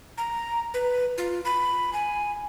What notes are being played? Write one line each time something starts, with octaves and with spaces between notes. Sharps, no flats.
A#5
B4
F4
B5
G#5